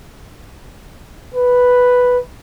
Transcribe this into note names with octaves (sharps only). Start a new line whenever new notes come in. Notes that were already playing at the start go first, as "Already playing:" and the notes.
B4